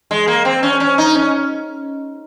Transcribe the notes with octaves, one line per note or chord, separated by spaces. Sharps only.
G#3
A#3
C4
C#4
C#4
D#4
C#4